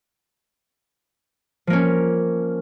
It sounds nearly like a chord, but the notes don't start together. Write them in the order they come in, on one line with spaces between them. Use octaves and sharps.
F3 A#3 C#4